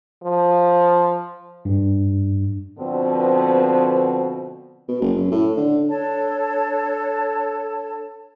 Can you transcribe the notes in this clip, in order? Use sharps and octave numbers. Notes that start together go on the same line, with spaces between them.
F3
G2
B2 D3 F3 B3 C4
B2
F#1
F#2
A2
D3
D4 A4 C#5 A5